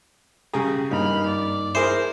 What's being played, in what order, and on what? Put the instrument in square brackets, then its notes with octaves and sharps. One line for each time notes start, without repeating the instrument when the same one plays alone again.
[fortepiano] C#3 G3 G#4 [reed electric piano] A#5
[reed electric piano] G2 A#3 D#4 [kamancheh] B5 F6
[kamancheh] D5
[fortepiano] E4 G#4 A#4 [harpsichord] C5